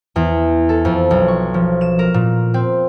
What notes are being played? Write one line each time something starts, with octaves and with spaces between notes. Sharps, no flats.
E2
A4
F2
B1
C#6
F3
E7
A#4
A#2
C4